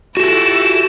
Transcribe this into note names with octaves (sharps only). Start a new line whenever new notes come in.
E4 F#4 G4 A4 E7